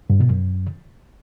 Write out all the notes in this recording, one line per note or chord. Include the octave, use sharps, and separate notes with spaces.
G2
B2
F#2